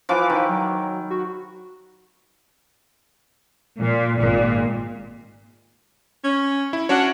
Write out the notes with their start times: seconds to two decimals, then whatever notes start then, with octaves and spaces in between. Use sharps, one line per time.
0.09 E3 F3 D6
0.30 D#3 B4
0.49 F#3
1.10 F#4
3.79 A#2
4.18 G#1 A#2
6.23 C#4
6.73 E4
6.89 C#4 D4 F#4 C#5 F#5